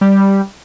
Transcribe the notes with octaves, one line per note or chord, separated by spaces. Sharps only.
G3